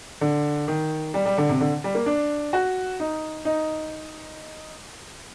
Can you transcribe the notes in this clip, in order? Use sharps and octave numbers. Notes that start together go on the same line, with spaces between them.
D3
D#3
G3
G3
D3
C3
D3
G3
A#3
D4
F#4
D#4
D#4